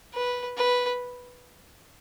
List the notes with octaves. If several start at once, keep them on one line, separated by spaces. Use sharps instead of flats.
B4
B4